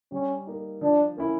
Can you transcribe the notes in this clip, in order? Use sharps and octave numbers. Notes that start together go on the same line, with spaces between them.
G3 C#4
A#3 D#4
F3 D4
A#3 C#4 E4